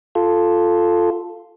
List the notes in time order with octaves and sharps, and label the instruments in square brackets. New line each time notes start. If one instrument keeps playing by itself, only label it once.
[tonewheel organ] F4 A4